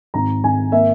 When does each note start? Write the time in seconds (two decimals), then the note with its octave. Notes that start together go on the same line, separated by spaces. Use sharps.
0.14 G#1 A#5
0.44 G#1 G#5
0.72 A#3 E5